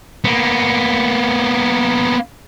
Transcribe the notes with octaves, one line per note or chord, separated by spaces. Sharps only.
A#3 B3